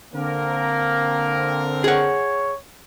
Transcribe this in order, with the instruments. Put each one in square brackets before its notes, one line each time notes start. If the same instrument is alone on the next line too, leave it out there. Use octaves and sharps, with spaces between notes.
[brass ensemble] D3 C4 A#4 [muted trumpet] A#3
[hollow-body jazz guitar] G#4 F#5 [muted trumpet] C#5